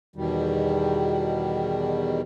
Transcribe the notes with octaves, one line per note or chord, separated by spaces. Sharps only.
E2 B2 D#3 G3